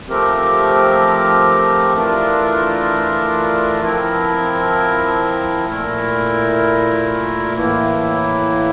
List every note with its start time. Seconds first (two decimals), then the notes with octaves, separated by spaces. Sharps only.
0.07 F3 A3 C4 G4 A#4
1.94 E3 A3 D4 F4 A#4
3.81 F3 C4 E4 A#4
5.67 A#2 A3 E4 A#4
7.54 A2 E3 A#3 E4